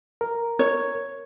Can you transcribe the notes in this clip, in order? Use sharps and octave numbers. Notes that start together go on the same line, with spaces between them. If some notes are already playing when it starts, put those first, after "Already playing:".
A#4
C#5